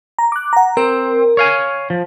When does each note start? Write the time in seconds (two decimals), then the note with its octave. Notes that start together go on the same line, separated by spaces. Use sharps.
0.19 A#5
0.32 D6 F#6
0.53 F#5 A#5
0.77 C4 A#4
1.37 C#5 F5 G#5
1.90 F3